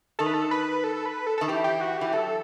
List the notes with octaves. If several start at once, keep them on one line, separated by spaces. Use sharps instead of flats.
D#3 A4
B4
A4
B4
A4
B4
A4
D#3 A4
E3 G4
G4
F#4
E3 G4
F#3 A4